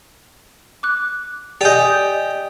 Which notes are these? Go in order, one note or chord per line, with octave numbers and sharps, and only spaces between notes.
D6 F#6
G4 D5 D#5 G#5 G6